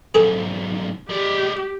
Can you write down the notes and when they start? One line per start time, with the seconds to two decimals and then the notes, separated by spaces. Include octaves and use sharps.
0.15 B1 G#2 G#4 A4
1.09 G#3 G4 D5